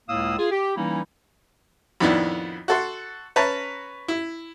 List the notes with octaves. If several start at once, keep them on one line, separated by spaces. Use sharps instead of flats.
C#2 A2 A#3 F5 D#6 E6
F4 G#4
G4
E3 G3 A#3 C#4 D#4 E4
F2 A2 D#3 B3 D4 E4
F#4 A4 C6
C#4 B4 C#5 A5 A#5
E4